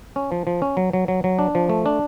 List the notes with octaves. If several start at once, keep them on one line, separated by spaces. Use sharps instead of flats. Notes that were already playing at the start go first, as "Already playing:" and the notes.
C#4
F3
F3
C#4
F#3
F#3
F#3
F#3
D4
F3
A3
D4